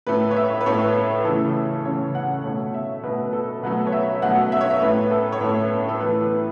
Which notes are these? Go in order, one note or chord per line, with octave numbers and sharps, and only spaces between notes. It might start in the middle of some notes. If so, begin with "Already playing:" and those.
A2 A3 B4
C#5
E5
B4
A2 A3 C#5
C#3 E3 A3 A4
C#3 E3 A3 C#5
F#5
B2 A3 C#5
E5
B2 A3 B4
A4
B2 F#3 A3 B4
C#5
E5
B2 F#3 A3 F#5
E5
C#5
E5
A2 A3 B4
A4
C#5
A2 A3 B4
A4
A2 E3 A3 B4